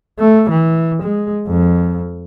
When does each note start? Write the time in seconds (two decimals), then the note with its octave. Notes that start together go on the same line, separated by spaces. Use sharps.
0.19 A3
0.50 E3
1.03 G#3
1.47 F2